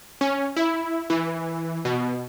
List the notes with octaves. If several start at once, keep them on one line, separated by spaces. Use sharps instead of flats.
C#4
E4
E3
B2